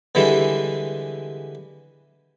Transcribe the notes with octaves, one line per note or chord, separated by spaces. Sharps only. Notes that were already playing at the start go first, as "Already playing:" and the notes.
D3 E3 G3 G#3 E4